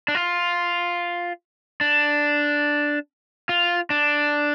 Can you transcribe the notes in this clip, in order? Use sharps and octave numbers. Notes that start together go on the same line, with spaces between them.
D4
F4
D4
F4
D4